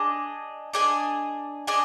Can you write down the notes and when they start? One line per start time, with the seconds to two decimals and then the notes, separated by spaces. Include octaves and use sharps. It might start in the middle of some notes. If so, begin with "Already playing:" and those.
Already playing: D4 G#4 D#5
0.74 D4 G#4 D#5 G#5
1.67 D4 G#4 D#5 G#5